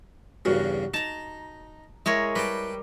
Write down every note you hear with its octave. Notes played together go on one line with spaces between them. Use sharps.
E2 G2 C#3 F#4 A#4
D#4 A5 A#5
G#3 E4 A#4 C#5
G3 B4 G5 A5